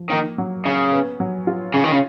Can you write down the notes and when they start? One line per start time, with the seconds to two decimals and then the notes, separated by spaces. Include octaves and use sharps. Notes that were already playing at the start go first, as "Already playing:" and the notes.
Already playing: F3
0.10 D#3 A#3
0.38 F#3
0.66 C#3 C#4
0.93 B3
1.20 F#3
1.47 F4
1.74 C#3 C#4
1.84 D#3
1.92 C#3